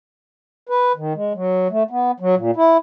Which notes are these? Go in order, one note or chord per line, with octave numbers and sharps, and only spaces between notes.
B4
D#3
G#3
F#3
A3
B3
F#3
A#2
E4